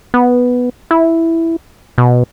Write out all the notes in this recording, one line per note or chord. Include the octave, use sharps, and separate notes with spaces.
B3
E4
B2